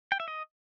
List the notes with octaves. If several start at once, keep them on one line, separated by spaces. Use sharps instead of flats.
G5
E5
D#5